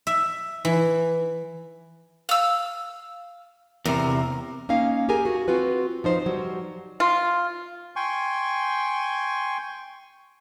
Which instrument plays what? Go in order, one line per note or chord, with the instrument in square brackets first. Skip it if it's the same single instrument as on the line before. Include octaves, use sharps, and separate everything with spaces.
[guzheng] E5
E3
[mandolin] F5 E6
[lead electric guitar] E2 C3 [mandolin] A#4
[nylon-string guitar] A#3 C#4 D#4 F5
G4 G#4 A#4 G#5
F#4
C4 F4 F#4 B4
F3 D#4 C5
F#3 G3
[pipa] F4
[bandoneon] G5 G#5 C6 C#6